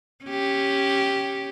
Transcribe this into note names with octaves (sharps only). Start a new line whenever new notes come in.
C#4 G4